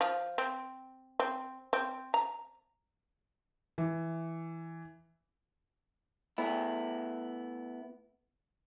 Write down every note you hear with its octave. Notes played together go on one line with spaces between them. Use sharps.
F3
C4
C4
C4
A#5
E3
A3 B3 E4